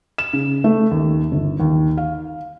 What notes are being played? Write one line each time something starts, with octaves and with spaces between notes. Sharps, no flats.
E7
C#3
A3
D#2
G1
D#2
F5